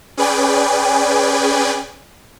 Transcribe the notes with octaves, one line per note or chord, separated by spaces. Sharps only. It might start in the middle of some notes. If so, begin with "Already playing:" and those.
C#4 G#4 B4 D5 G5 G#5